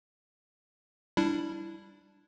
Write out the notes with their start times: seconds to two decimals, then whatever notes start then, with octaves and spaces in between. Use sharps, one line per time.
1.17 G3 D4 E4